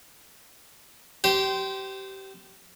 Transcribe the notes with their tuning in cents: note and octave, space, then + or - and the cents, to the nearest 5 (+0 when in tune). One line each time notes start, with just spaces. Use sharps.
G4 -25 C5 -10